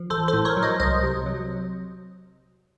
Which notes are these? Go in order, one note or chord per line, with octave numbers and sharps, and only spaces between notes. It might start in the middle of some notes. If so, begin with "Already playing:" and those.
Already playing: F3
A1 A4 C5
A4 C5
A2
A#4 C#5
F#3
C5 D#5
C2 C5 D#5
C3
F#3